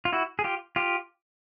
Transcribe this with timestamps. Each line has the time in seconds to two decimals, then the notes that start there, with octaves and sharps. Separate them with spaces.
0.05 F4
0.13 E4 F#4
0.39 G#4
0.44 F4 G4
0.76 F4 G4